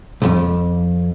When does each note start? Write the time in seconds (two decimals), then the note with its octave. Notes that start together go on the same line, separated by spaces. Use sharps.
0.22 B1 F2